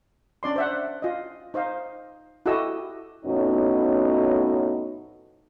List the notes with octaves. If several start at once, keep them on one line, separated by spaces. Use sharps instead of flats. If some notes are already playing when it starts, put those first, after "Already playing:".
C#4 D4 D5 C6
C5 E5 F#5
F4 D#5
D#4 C5 D#5 F5
E4 F#4 G4 A4 D#5 E6
F2 A2 B3 C#4 D#4 F#4